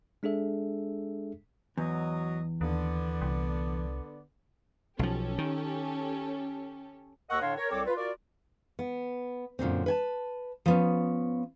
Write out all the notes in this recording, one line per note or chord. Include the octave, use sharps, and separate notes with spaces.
G#3 D4 G#4 A4 E5
E2 F#3 D#5
D#2 D3 B3 D5
C2
B1 F3 C#4 G4 A4
D#3
D#2 A#4 D#5 F#5 C#6 E6
A2 D3 D4 C#5 F5 C6
A#4 C#5
C2 C4 A4 C#5 D6
F4 B4
F4 F#4 A#4 D5
B3
F#2 A#2 D3 C4
B4 G#5 A5
F3 B3 C#4